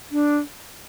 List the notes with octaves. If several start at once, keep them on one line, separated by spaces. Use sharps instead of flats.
D4